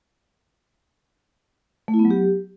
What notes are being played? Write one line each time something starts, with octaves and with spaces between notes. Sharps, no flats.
A3
E4
B3
F#3
G4